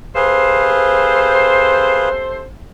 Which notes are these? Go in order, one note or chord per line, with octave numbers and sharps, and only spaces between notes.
C3 G#4 A4 B4 C5 F5